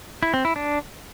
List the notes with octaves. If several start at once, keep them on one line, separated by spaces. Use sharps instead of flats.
E4
C4
E4
D4